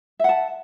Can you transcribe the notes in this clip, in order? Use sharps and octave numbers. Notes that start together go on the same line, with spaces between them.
E5 F#5 A5